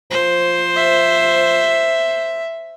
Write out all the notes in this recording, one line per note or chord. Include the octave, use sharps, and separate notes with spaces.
F3 C5
E5